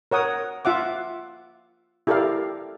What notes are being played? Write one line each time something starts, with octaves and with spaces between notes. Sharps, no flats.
A#4 C#5 F#5 D#6
F4 E5 F#5 D6
E4 G4 A4 A#4 D5 F5